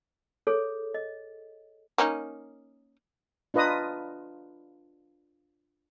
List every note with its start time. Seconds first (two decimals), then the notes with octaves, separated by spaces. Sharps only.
0.47 G#4 A4 C#5
0.94 D#5
1.98 A#3 C#4 D#4
3.54 D4 F4 B4 D#5 A#5 D#6